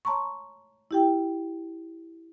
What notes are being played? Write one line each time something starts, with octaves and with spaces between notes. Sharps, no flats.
C#5 A5 A#5 C6 C#6
E4 G4 G5